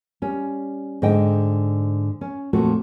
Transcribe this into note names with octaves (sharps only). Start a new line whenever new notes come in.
G3 C#4
G#2 D3 D#4 D#5 G5
C#4
F2 A#2 A3 F#4 A4